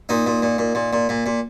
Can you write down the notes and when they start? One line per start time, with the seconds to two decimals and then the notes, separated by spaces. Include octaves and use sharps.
0.09 A#2 D#4
0.27 A#2
0.42 A#2
0.58 A#2
0.75 A#2
0.93 A#2
1.09 A#2
1.26 A#2